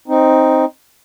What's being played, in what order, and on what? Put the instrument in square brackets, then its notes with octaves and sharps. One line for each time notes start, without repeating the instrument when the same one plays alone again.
[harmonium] C4 D#4